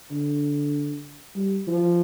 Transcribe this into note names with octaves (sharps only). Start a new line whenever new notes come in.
D3
G3
F3